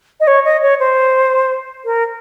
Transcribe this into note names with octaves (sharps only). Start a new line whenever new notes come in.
D#5
C#5
D#5
C#5
C5
A#4